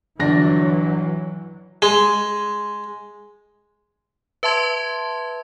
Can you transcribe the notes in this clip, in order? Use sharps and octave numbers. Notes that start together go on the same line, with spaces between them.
G1 E3 F#3 D4 A#6
G#3
B4 E5 A5 C6 G#6